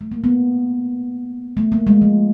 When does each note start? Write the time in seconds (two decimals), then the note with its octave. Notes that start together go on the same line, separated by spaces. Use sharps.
0.01 A3
0.12 A#3
0.24 B3
1.57 A3
1.72 A#3
1.87 G#3
2.02 F3